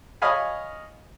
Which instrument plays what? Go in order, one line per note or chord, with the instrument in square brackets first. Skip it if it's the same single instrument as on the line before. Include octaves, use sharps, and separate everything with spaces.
[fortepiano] C#5 D#5 F5 G#5 B5